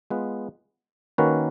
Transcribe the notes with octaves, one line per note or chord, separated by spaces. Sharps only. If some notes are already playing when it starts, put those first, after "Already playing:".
G#3 B3 F4 B4
D#3 A#3 C#4 F#4 B4